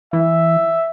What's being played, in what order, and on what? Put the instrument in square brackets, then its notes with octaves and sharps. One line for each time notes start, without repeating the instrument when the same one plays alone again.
[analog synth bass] E3 [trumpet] E5